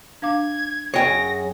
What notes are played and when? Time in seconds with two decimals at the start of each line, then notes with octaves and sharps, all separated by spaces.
0.22 D4 F5 D6 G#6
0.94 F#2 C3 G#4 C#5 G5 A#6